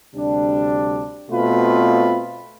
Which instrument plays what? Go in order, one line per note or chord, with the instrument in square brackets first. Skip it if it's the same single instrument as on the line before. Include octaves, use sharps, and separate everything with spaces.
[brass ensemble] D2 C3 G3 D4
B2 A3 C4 F4 B4